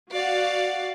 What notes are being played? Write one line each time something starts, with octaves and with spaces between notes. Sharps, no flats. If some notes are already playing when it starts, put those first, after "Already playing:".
F#4 D5 F5 F#5